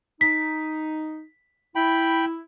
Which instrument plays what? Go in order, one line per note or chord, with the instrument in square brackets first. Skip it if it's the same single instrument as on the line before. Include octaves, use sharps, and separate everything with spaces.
[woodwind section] D#4 [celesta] B6
[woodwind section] E4 [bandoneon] G5 B5